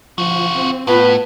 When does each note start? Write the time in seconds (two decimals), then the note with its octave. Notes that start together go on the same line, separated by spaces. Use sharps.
0.18 F3 F4 F#4
0.55 C4
0.87 A2 B3 F4 B4